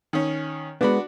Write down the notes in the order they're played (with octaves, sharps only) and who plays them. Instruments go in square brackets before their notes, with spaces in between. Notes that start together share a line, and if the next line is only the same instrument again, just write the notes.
[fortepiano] D#3 C#4
[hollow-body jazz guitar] G#3 B3 [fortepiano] D4 F#4 B5